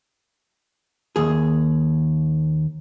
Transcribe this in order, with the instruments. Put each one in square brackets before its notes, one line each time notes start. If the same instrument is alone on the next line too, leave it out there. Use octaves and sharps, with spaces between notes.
[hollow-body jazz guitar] D#2 G#4